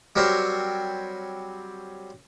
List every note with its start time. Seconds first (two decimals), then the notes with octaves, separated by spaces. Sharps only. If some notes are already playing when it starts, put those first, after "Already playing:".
0.16 F#3 G3 C4 A#4 C5 C#5